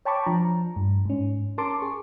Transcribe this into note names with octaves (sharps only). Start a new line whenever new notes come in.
C#5 G5 A5 B5 C#6 D6
F3 D4 A#5
G2
G#2 C#4
C#4 A#4 A5 C6 D6
G#4 C#6